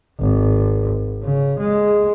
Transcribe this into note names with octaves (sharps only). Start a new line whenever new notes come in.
G#1
C#3
G#3